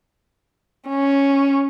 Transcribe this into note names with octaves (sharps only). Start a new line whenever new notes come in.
C#4